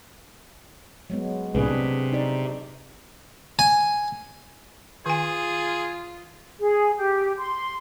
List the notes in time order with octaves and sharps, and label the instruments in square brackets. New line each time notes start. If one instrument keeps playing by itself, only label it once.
[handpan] F#3 G#3 B3
[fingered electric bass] C2 A2 C3 [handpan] D4 G#4 B4
[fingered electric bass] C3
[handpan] D#4 D5
[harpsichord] G#5
[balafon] D#3 G#5 [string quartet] F4 [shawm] G#4
[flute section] G#4
G4
C6